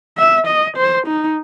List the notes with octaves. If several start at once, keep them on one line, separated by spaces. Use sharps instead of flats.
E5
D#5
C5
D#4